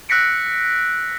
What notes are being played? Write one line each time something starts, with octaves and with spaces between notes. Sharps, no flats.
E6 F#6 A#6 B6 C#7 D7